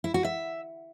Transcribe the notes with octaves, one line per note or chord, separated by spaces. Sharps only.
E4
F#4
E5